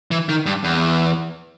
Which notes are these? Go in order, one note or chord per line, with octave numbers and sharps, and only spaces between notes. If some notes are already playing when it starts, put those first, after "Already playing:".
E3
D#3
G2
E2